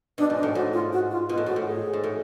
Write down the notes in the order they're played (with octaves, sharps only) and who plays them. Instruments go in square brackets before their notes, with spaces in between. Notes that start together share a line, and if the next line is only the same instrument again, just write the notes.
[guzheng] B2 [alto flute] D4
[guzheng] G#2
[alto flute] D4
[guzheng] A2
[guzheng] G#2 [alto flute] F#4
[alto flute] F4
F#4
F4
[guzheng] B2 [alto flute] F4
[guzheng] A2
[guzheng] G#2 [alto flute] F#4
[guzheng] A2
[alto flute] G#4
[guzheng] G#2
A2